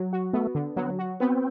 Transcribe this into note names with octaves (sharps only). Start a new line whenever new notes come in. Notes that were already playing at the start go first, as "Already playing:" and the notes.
Already playing: F#3
F#4
A3 B3
D3
F#3 B3
F#4
B3 C4